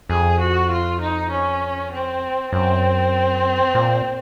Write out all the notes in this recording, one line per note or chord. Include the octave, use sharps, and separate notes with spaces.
F2 G#4
F#4
F4
D#4
C#4
C4
F#2 C4
A#2